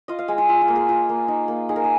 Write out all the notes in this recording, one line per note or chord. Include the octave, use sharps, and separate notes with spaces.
F4 D#5
F5
G#3 G#5
F4
F4
F4
A#3
G#4
F4
A#3
D#4
A#3
D#4 G#4
A#4
G#4